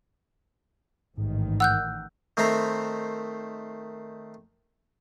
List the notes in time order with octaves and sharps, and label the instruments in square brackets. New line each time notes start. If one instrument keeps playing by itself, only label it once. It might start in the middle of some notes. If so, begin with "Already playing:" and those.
[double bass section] A1 D#3 [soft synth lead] G#2
[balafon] F#5 [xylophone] E6 F#6 G6
[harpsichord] D#3 A3 C4 C5 E5 A#5